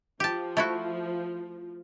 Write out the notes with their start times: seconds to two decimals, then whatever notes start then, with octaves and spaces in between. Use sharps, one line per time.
0.20 F3 G4 A5
0.57 A3 E4 F#4